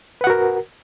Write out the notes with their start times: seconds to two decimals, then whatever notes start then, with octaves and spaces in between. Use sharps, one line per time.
0.21 B4
0.24 F#5
0.27 F#4
0.30 A#4